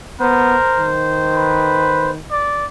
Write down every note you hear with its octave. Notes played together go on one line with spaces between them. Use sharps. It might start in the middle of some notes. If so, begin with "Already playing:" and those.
B3 A#4 C5
D#3
B4
D5